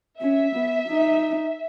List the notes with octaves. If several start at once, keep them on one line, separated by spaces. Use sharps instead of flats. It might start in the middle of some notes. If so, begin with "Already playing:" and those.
C#4 E5
B3
D#4